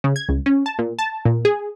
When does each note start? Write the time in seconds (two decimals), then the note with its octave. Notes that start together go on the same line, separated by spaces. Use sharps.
0.04 C#3
0.16 G#6
0.29 C#2
0.46 C#4
0.66 A5
0.79 A#2
0.99 A5
1.25 A#2
1.45 G#4